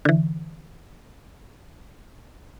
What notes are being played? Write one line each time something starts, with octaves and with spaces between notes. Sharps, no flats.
D3 E3